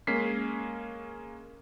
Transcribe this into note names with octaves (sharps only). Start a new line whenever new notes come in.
G#3 A#3 C#4 B6 C7